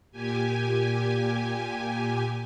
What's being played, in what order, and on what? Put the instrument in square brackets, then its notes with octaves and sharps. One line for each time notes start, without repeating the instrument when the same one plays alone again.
[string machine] A#2 G4 G#5